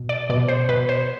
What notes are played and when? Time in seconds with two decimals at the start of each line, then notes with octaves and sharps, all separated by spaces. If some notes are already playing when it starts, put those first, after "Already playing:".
Already playing: B2
0.09 D5
0.30 B2 D5
0.48 C5
0.69 B2 B4
0.89 C5